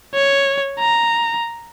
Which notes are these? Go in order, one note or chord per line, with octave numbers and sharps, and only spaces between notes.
C#5
A#5